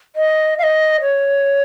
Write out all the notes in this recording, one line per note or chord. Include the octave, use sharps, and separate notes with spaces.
D#5
F5
D#5
C#5